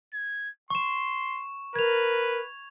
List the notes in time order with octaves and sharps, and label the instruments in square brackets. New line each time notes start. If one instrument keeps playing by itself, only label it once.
[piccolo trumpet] G#6
[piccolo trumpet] C6 [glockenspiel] C#6 E7
[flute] A#4 [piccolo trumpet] B4 [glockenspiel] G#6 F7